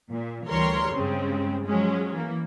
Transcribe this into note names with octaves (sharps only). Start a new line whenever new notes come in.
A#2
D2 E3 G3 A#4 C#5 C6
G2 C#3 G#3 C4
F3 F#3 G#3 C#4
E3 A#3